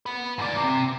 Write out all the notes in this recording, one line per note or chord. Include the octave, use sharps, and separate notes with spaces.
B3 B4
G#2 D5
C3